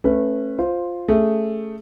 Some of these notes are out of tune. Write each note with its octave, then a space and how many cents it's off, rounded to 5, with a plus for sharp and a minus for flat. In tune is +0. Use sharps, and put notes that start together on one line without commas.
A3 -5 C#4 -25 B4 +0
F4 +5 C5 +0
A3 +0 C#4 +0 G#4 +0